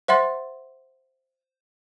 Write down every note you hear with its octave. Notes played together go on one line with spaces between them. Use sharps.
C5 E5 F#5 C6 A6